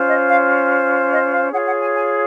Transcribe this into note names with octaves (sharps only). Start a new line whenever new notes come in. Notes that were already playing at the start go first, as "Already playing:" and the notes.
Already playing: C#4 F4 C5
D#5
F5
D#5
F5
F4 G#4 C#5 F#5
F#5
G#5
G#5